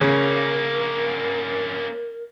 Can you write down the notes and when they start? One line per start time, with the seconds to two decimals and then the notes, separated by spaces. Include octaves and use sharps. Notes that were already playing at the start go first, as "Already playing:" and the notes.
0.01 C#3 A#3 C#4 A#4